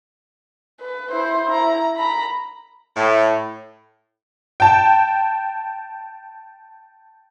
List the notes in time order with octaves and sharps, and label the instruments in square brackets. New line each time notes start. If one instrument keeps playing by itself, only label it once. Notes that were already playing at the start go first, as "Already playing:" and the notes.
[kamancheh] B4
E4 C5
E4 A#5
A#5 B5
[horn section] A2
[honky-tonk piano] G5 A5